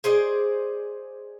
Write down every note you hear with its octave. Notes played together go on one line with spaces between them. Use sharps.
G#4 C5 D5 D#5